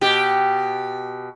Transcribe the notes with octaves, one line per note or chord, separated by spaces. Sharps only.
B2 G4